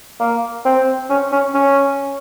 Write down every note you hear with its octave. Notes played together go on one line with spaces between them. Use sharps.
A#3
C4
C#4
C#4
C#4